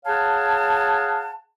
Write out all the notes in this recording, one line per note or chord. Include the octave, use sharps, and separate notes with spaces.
G#4 C#5 F5 F#5 G#5 A5